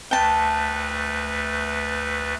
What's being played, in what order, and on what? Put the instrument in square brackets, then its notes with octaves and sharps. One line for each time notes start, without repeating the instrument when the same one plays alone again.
[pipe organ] D2 A3 B4 [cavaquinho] G5 A5